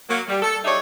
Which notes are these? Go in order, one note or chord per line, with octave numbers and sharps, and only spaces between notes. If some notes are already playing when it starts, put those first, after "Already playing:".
F#3 A#3
G3
A4
G3 D#4 G#4 C#5 D5 E5